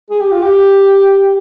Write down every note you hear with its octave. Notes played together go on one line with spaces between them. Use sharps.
G#4
G4
F4
G4